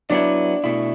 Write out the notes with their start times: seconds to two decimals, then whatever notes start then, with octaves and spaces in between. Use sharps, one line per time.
0.10 F#3 B3 D4 E4
0.64 B2 A3 E4